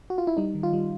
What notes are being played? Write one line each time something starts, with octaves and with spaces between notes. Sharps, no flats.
F#4
F4
E4
G3 D#4
D#3
F4
G3